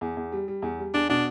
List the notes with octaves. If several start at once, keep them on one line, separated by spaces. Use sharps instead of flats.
E2
E2
G3
G3
E2
G3
E2 D4
B2 D4